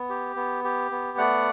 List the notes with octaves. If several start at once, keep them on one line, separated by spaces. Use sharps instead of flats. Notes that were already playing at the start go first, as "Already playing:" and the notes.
Already playing: B3
G4
B3
G4
B3
A3 D5 F#5